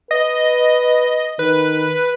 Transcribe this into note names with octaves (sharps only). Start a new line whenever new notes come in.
B4 D#5
D#3 B4